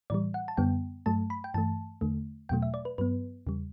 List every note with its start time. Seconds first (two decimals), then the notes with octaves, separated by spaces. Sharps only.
0.10 A2 E3 G3 D5
0.34 F#5
0.48 A5
0.57 F#2 D3 G3 B3 G5
1.06 G2 F#3 A3 A5
1.30 B5
1.44 G5
1.54 G2 E3 A3 A5
2.01 E2 D3 A3
2.49 E2 B2 F#3 A3 G5
2.62 E5
2.74 D5
2.85 B4
2.98 G2 F#3 B3 B4
3.47 E2 C#3 G3